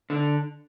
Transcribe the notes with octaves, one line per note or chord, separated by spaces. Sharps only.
D3